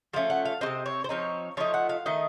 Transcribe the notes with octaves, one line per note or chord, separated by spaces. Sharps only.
F3 A3 C#4 F5
F#5
F5
F#3 C4 D#5
C3
C#5
C5
F3 C4 D#4 C#5
F3 A3 D#4 C#5
F#5
F5
D#3 A3 D#4 D#5